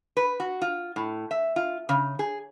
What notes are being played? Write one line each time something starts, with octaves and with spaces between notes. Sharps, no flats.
B4
F#4
F4
A2
E5
F4
C#3
G#4